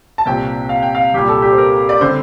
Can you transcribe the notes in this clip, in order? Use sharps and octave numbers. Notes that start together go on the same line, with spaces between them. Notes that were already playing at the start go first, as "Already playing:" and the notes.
A5
C2 A#2 F3 C4 G5
F5
G5
F5
C2 A#2 G3 G4
A4
G4
C5
A#4
D5
D3 G3 C4 C5